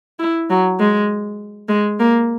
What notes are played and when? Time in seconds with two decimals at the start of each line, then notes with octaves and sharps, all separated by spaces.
0.19 E4
0.50 F#3
0.80 G#3
1.68 G#3
1.99 A#3